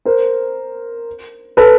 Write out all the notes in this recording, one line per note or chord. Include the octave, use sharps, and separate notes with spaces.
A#4 C5
A4 B4